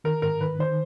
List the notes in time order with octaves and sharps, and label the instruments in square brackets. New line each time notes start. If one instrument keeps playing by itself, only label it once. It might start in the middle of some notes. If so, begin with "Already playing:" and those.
[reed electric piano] D#3 [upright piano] A#4
[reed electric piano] G#2 [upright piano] A#4
[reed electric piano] D#3 [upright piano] B4
[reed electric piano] D#3 [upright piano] C5